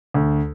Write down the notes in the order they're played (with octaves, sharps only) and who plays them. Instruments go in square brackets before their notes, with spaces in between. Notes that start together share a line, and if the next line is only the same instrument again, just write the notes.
[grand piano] D2